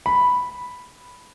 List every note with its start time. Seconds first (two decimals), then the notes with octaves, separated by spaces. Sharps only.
0.06 B5